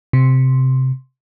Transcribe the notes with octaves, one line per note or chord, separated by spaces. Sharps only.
C3